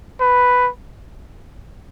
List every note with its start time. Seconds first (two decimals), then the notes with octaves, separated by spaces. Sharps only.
0.20 B4